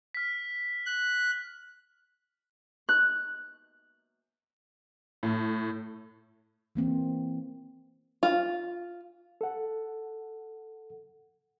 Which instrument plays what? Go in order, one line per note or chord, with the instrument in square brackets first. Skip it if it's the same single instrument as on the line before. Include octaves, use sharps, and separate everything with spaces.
[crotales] F6 B6
[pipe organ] F#6
[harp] F#6
[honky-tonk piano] A2
[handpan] E3 A#3 C4
[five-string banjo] F4
[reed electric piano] A4 F#5